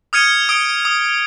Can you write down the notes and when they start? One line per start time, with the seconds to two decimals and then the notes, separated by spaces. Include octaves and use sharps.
0.13 D#6 F6 G#6 C#7 D#7 G7
0.49 D#6 C#7 D7
0.85 D#6